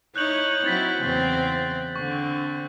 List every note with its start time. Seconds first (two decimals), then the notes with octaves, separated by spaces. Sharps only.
0.16 D#4 E4 C#5 F#6 G6 F#7
0.65 F#3 C4 E4 G#6 A6 B6
1.00 E2 C#3 C4
1.96 D3 C4 C#6